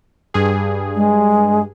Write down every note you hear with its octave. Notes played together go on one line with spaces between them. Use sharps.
G2 G#4
G#3